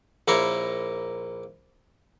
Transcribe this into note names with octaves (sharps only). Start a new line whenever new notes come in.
A#1 A#3 E4 C#5 A#5 C6